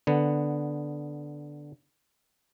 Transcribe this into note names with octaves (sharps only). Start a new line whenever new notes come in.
D3 B3